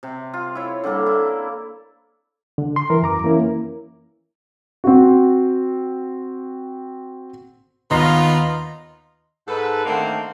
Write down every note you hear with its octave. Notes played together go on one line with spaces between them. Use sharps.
C3
F4
E4 C#5
D3 G3 A#3 A4
E4
D3
C6
E3 A#4
F#2 A#5 D6
E3 A#3 C#4 E4 A#4
C4 F#4
D#2 B3 D#4 F4 D#5 A#5 C6 C7
G#2 A4 B4
D3 D#3 A3 A#3 C4